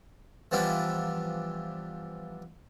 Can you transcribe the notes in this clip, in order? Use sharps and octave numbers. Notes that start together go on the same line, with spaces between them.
E3 F3 G3 B3 D4 E4